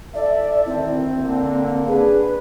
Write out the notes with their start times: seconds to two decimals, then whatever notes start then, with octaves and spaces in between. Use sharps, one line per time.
0.15 E4 A4 D5 E5
0.66 D2 D#3 C4 E4
1.19 D3 A#3
1.88 D4 G#4 B4